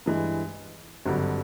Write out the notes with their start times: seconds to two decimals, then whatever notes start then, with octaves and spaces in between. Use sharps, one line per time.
0.06 G2 E3 G#3
1.06 G#1 G2 D3 F#3